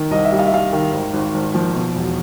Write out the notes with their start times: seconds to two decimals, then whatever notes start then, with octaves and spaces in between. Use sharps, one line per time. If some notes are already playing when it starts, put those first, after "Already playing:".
Already playing: D#3
0.11 C2 D#5
0.25 E5
0.32 G3
0.39 F5
0.46 E5
0.52 G3 F5
0.73 D#3
0.93 G#1
1.13 G#1
1.34 G#1
1.54 F3
1.75 B2
1.95 E1